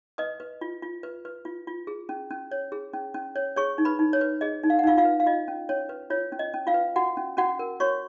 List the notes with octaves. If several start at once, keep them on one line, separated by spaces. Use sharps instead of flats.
B4 D#5 D#6
B4
F4
F4
B4
B4
F4
F4
G#4
C#4
C#4
C#5
G#4
C#4
C#4
C#5
G#4 C#5 C#6
D#4
B4 B5
D#4
C#5
B4
G#4 D#5
D#4
F5
F#5
D#4 F4 F5
F4 F5
B4
F5
F4 D#5
C#4
C#4 C#5
B4
F4 C#5
C#4
D#5
C#4
F4 F5
B4
F#4 F#5
C#4
C#4 F#4 F#5
A#4
F#4 C#5 C#6